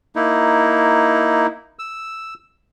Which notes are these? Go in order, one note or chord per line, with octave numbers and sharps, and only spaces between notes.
A#3 D#4 E4
E6